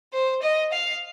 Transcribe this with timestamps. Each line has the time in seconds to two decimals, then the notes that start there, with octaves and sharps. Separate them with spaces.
0.13 C5
0.42 D#5
0.72 F5